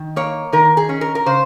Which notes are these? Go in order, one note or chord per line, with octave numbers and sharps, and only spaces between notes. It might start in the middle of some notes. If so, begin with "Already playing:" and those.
Already playing: D#3
A#3 C#5
D#3 A#4
G#4
C#4
A#4
A#4
C#3 C5